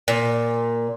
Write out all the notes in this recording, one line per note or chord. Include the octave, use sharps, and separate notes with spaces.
A#2